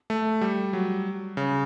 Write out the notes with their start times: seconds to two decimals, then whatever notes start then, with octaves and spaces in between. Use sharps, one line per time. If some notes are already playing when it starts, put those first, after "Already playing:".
0.10 A3
0.41 G3
0.73 F#3
1.37 C#3